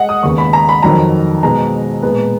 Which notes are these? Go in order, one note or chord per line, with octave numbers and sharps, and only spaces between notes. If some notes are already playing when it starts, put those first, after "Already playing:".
Already playing: G#3 D#5 F#5
D#6
D#2 C#3 G#3 B3 C#6
B5
A#5
B5
F2 D#3 F#3 A#5
B2 G#3 B3 A#5
A#2 G#3 B3